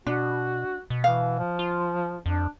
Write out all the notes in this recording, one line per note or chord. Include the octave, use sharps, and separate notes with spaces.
B2 D4 F#4
B2
E3 F5
F3
F4
F2 D4